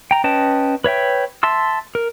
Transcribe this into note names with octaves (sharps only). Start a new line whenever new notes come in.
G5 A#5
C#4 B4 D#5 G5 A5
B4 C#5 E5 G5
E5 A5 C6 E6
A#4